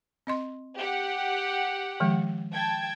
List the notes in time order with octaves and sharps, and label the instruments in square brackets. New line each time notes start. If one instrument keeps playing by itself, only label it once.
[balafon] C4 D#5 C6
[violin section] G4 F#5
[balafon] D#3 F3 G#3
[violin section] G5 A5 G#6